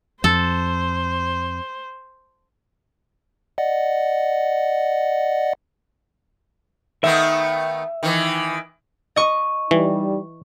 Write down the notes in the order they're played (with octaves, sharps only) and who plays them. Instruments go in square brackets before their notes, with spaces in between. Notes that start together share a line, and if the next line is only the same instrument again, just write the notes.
[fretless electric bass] F2 [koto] A4 [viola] C5
[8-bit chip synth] D5 D#5 F#5
[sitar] D#3 A3 B3 [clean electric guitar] E5
[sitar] D#3 E3
[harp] D#5 C#6
[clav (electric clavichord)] E3 [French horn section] G3 D#4